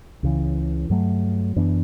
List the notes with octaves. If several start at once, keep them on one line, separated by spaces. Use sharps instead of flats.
C#2 C#3 E3
G2 F#3 A3
F#2 E3 B3 D4